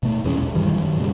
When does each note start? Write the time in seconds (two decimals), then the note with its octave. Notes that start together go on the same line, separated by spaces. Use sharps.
0.03 B2 A3
0.24 E2 E3 G#3 C#4
0.37 E1 B1
0.55 G2 D#3 E3 G3
0.74 F#2 D#3 F#3
0.98 A#2 C#3 F3 G3